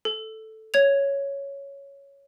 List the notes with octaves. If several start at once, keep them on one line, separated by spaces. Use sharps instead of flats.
A4
C#5 G#6 F7